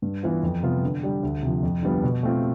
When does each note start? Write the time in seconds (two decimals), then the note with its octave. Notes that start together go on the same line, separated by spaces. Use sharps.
0.02 G2
0.23 E3 B3 F4
0.43 F2
0.63 C3 G3 B3 F4
0.83 D3
1.03 G3 D4 G4
1.23 D2
1.43 C3 F3
1.63 F2
1.83 D3 G3 B3 F4
2.04 B2
2.23 A3 C4 F4